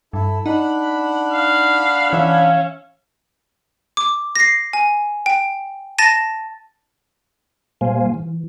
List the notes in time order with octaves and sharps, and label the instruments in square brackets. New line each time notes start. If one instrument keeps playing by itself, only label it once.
[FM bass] G2 [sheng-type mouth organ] E4 A4
[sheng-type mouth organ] D4 F#5 B5 [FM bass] D#4
[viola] F5
[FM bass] E3 [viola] C#4 [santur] E5 F5
[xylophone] D6
A#6 C7
G#5
G5
A5 A6 A#6 D#7
[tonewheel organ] A#2 G3 A#3 C5 F5 G#5
E3